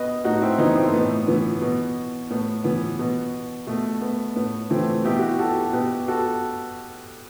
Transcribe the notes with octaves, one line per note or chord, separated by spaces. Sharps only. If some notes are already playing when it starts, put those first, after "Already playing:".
Already playing: B2 B4 D#5
A2 D#4 F#4
C4 E4
E3 B3 D#4
A3 C4
C4
A2 B3
E3 B3
B2
A2 B3
E3 B3
B2
B2 A3
B3
A2 B3
E3 A3 C4
B2 E4 G4
F#4
G4
F#4 A4
B2 G4 B4
F#4 A4